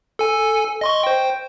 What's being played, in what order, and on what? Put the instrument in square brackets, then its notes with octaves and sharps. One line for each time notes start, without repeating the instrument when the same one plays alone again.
[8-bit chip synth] A4 G#5
D#5 C6 C#6
C5 G5